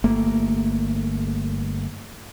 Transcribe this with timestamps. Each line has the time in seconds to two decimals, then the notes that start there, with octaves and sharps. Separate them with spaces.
0.04 G1 A3 A#3